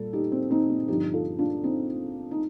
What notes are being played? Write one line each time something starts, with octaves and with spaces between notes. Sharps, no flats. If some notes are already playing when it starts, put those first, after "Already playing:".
Already playing: A#2 G3 A4
D#4 G4
C4
C4 D#4
C4
G2 D3 F3 D#4 G4
F4 A4
D4 F4
C4 D#4
D#4